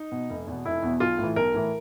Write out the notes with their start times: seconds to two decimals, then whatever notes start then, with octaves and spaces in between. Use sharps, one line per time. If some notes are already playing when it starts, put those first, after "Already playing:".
Already playing: D#4
0.12 B2
0.30 F1
0.47 E2 B2
0.65 F1 E4
0.83 E2 B2
1.00 B1 F4
1.18 A2
1.23 E3
1.36 B1 A#4
1.54 A2 E3